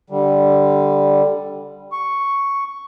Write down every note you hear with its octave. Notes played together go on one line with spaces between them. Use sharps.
D3 G3
C#6